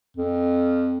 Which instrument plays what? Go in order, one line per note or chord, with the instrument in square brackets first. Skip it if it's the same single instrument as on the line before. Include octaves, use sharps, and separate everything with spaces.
[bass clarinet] F2